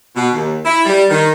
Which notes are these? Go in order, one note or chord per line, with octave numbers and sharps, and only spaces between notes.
B2
D#2
E4
G3
D#3